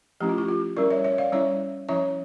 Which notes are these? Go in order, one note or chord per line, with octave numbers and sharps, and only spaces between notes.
F3 A3 C#4 E4 G4
F4
E4 G4
F4
G3 C#4 E4 A#4 D5
C#5 E5
C#5 E5
D5 F5
G3 C#4 E4 C#5 E5
F3 C#4 E4 C#5 E5